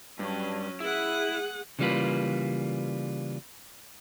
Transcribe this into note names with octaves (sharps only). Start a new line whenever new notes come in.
G2 F#3 C#4
E4 G#4 F#5
C#3 E3 G3 A#3 F4 B4